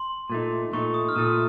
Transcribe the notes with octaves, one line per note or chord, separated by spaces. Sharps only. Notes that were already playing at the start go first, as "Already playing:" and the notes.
Already playing: C6
A#2 A3 D#4
A#2 A3 D#4 C#6
D#6
F6
A#2 A3 D#4 D#6